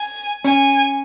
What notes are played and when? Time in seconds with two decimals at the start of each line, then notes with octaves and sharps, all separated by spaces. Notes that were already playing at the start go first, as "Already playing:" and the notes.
Already playing: G#5
0.45 C#4 G#5